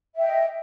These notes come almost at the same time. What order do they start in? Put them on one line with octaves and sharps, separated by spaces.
E5 G5 D#5